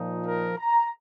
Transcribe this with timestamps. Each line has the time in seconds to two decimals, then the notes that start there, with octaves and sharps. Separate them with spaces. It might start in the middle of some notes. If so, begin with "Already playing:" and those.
Already playing: A#2 F3 D#4
0.27 A#4
0.58 A#5